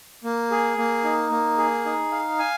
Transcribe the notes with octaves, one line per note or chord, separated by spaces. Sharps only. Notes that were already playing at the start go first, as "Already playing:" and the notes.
A#3
G#4
A#3
D#4
A#3
G#4
D#4
F5
G#5